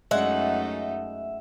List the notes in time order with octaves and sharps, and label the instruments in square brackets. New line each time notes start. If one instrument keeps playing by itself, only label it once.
[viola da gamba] F#2 A3 D#4 [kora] G#3 [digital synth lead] E5 [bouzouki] F#5